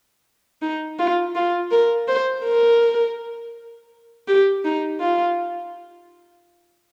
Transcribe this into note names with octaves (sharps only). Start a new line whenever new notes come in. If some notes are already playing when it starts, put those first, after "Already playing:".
D#4
F4
F4
A#4
C5
A#4
G4
D#4
F4